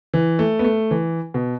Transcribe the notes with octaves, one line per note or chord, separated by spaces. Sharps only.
E3
A3
B3
A3
E3
B2